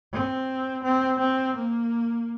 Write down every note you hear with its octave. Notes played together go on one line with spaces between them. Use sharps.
C4
C4
C4
A#3